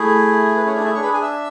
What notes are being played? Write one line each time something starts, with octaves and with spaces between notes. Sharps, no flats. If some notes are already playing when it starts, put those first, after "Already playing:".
Already playing: A3 E4 G#4
B4
C#4 C#5
D4 D5
E4 E5
D4 G#4 C#5 C#6
B4 B5
G#4 G#5
E5 E6